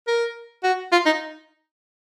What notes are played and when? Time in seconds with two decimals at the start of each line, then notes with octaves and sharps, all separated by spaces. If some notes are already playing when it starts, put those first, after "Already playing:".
0.07 A#4
0.64 F#4
0.92 F4
1.06 D#4